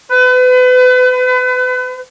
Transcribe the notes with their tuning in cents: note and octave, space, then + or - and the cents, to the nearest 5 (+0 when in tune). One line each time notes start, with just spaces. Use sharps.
B4 +35